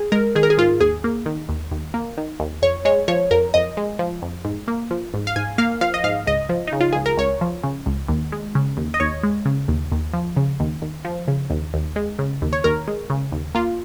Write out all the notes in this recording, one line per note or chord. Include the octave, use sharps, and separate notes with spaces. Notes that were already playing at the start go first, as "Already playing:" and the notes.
Already playing: G#4
G#3 A#4
D#3 G#4
A#4
G#4
G#2 F4
D#2 G#4
A#3
D#3
D#2
D#2
A#3
D#3
D#2
F2 C#5
G#3 C#5
F3 C#5
F2 A#4
F2 D#5
G#3
F3
F2
G#2
A#3
F3
G#2
F5
G#2 G#5
A#3 F5
F3 F5
D#5
G#2 F5
C#2 D#5
F3
C#3 D#4
F4
C#2 G#4
A#4
C#2 C#5
F3
C#3
C#2
D#2
G#3
C#3
D#2
D#5
D#2 C#5
G#3
C#3
D#2
D#2
F3
C#3
D#2
D#2
F3
C#3
D#2
D#2
G#3
C#3
D#2
C#5
D#2 A#4
G#3
C#3
D#2
A#3 F4